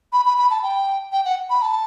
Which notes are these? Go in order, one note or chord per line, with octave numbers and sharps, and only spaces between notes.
B5
B5
B5
A5
G5
G5
F#5
B5
A5